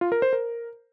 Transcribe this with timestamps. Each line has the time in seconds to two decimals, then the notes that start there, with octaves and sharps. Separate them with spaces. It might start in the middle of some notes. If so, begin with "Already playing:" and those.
0.01 F4
0.12 A#4
0.22 C5
0.33 A#4